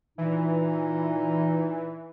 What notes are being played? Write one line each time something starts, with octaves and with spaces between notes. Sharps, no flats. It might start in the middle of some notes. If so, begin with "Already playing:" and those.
A#2 E3 D#4